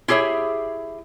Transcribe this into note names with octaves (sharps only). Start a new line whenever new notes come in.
E4 G4 G#4 C#5 E5